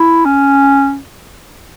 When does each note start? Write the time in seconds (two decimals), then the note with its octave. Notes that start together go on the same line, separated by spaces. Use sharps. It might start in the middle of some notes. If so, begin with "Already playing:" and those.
Already playing: E4
0.25 C#4